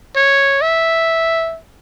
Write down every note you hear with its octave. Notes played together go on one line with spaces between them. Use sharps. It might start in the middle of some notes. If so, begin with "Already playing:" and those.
C#5
E5